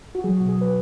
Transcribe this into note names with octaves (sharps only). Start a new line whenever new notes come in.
F#4
F#3 G#4
B2 F#4
G#4
F#3 B4